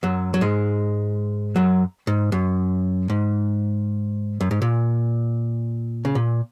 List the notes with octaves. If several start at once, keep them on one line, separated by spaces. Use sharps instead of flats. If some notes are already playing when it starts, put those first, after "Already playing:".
F#2 F#3
F#3
G#2 G#3
F#2 F#3
G#2
F#2
G#2
F#2
G#2
A#2
C#3
A#2